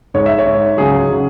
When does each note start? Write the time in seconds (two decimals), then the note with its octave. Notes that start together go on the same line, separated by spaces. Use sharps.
0.14 G#2 G#3 C#5
0.26 E5
0.39 C#5
0.46 G#2 G#3
0.77 C#2 C#3 F#3 G#4
1.10 C#3 F#3